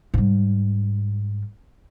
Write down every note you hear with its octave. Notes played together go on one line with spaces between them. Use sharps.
G#2 G3